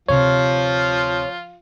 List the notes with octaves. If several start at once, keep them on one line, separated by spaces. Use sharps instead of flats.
D2 C3 F3 F4 C#5